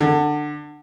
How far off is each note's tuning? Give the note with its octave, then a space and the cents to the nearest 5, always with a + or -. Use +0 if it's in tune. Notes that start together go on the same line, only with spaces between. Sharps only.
D3 +20